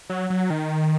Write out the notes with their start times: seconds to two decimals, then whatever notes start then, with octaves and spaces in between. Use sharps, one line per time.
0.10 F#3
0.30 F#3
0.50 D#3